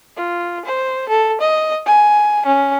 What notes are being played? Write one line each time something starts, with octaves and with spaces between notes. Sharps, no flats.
F4
C5
A4
D#5
G#5
C#4